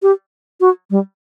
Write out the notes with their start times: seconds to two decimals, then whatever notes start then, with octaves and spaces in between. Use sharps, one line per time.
0.03 G4
0.61 F#4
0.91 G3